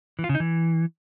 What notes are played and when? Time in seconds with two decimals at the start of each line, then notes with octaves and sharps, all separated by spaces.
0.19 E3
0.24 F4
0.29 C#3
0.35 D#4
0.40 E3